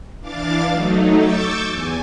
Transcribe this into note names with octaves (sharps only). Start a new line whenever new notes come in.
E3 D4 F5 D6 A6
F#3 A3 D#4
C#6 D6 E6 G6 A6
E2 G#5